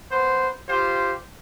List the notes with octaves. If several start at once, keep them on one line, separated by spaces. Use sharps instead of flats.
B3 C5
F4 G4 C5